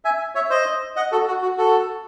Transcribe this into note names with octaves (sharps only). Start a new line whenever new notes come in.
E5 G#5
C#5 E5
C5 D#5
D#5 F#5
F#4 A4
F#4
F#4
F#4 A4